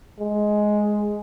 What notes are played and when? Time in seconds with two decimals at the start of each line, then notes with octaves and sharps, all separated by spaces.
0.19 G#3